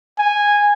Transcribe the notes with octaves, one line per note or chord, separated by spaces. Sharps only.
G#5